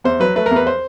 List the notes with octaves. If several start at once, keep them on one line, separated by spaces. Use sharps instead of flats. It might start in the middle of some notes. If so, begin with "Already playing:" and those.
E2 C5
F#3 B4
A3 B4
E2 A#4
B4
C5